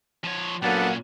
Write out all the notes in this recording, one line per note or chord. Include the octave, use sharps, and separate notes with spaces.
F3 C#5
A#2 F#3 A#3 B3 C#4 D4 A4 F#5